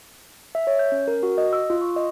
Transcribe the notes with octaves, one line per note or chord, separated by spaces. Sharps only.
E5
C#5
G6
C#4
A#4
F#4
D#5
E6
F4
C#6
D#5